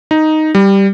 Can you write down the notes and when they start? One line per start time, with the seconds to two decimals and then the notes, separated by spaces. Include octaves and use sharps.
0.11 D#4
0.55 G3